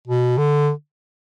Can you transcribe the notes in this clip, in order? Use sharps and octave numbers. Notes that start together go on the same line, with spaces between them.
B2
D3